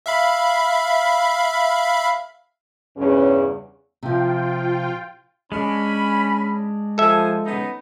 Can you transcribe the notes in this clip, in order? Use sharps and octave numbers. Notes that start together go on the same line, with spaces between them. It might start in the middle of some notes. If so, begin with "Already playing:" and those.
E5 F5 B5
E2 G2 C#3 C#4
C3 F3 F4 G5
G#3 C#4 D4 B5
F3 A4 E5 G#5
B3 C#4 D#4